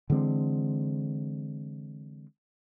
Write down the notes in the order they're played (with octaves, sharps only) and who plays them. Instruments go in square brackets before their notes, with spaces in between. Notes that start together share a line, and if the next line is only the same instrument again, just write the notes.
[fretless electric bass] D3 E3 G#3 C4